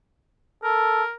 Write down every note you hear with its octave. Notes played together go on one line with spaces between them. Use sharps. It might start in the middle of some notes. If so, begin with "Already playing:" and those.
A4 A#4